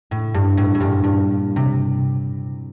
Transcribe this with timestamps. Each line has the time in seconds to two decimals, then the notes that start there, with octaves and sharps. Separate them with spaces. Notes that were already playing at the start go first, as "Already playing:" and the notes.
0.11 A2
0.34 G2
0.57 A2
0.75 A2
0.80 G2 A#2
1.04 G2
1.56 C3